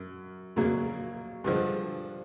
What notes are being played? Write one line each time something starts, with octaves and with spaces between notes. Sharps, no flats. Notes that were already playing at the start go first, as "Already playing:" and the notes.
Already playing: F#2
F#2 C#3 F#3 A#3
G2 D3 F3 G#3